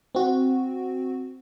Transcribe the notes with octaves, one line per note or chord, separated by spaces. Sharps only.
C4 F#4